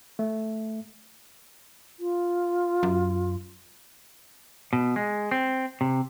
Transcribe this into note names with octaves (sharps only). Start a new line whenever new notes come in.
A3
F4
F#2
B2
G#3
C4
C3